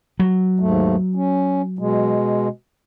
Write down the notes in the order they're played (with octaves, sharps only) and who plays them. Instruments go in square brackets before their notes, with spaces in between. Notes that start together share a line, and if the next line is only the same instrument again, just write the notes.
[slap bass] F#3
[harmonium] D#2 G#2 A3
C#4
B2 G#3